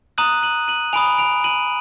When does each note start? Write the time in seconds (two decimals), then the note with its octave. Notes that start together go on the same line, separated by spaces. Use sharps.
0.18 A#5 D#6 F#6 D#7 F#7
0.43 D#7 F#7
0.68 D#7 F#7
0.93 G#5 B5 D#6 D7 F7
1.18 D7 F7
1.44 D#7 F#7